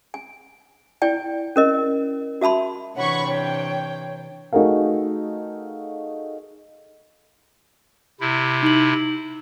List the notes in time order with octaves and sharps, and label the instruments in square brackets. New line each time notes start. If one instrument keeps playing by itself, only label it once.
[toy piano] G#5
E4 D5 G5 G#5
C#4 A#4 D#5
F#4 E5 A5 B5 C6
[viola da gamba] C3 E3 D4 [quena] C#5 [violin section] F#5 B5 C#6
[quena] C#5 [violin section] G5
[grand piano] A3 D#4 F#4 G#4 A#4 F5
[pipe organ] C3 E4
[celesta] D#4 F#7